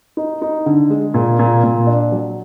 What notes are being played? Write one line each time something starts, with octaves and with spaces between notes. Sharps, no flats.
D#4
D#4
D3
G#3
A#2
A#2
A#2
D4
F#3